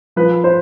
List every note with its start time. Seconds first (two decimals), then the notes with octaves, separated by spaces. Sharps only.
0.16 F3 B4
0.44 C5